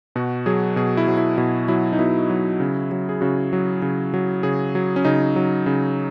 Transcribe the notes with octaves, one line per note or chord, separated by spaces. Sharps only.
B2 F#4
F#3 G#4
B2 G#4
E4
F#3
F#4
E4
B2 E4
F#3 E4
D#4
B2 E4
F#3
C#3
F#3
G#4
C#3 F#4
F#3
C#3
F#3
C#3 G#4
F#3
C#4
C#3 D#4
F#3
C#3